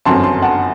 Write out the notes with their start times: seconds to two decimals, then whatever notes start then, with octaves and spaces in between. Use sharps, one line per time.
0.05 G1 F#2 F#3 C4 A5 C6
0.23 A5 C6
0.42 F#5 A5